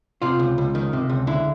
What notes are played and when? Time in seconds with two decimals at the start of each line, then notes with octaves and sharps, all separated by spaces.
0.22 C3 F4
0.39 C#2
0.58 C#2
0.75 D#3
0.93 C3
1.10 C#2
1.27 D3 E4